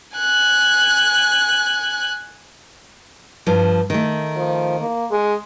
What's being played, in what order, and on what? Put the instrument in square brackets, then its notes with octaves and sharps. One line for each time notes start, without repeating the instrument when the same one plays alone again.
[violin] G#5 F#6
[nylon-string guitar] G2 F3
D#3 A3
[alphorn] F3
A#3
G#3